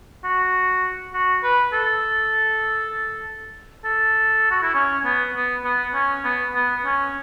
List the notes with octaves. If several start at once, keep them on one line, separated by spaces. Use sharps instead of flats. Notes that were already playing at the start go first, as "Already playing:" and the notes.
F#4
F#4
B4
A4
A4
F#4
E4
C#4
B3
B3
B3
C#4
B3
B3
C#4